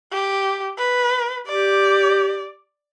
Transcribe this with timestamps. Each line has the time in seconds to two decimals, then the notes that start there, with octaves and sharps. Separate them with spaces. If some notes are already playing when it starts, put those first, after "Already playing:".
0.12 G4
0.78 B4
1.47 G4 D5